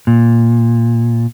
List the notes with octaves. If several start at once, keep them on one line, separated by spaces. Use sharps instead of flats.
A#2